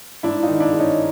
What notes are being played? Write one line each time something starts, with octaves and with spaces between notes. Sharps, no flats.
G#2 D4 E4
D#4 F4
D#3
D4 E4
G#3
C#4 D#4